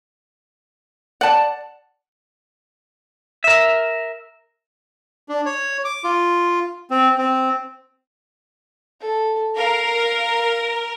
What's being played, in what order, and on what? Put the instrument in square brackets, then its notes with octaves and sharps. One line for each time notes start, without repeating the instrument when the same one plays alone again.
[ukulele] D5 A5 [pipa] F#5
[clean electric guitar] A#4 E5
[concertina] D4
C#5
D6
F4
C4
C4
[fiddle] A4
[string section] A#4 [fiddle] F5